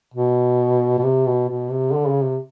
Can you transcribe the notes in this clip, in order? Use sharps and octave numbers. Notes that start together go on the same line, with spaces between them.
B2
B2
C3
B2
B2
C3
D3
C#3
C3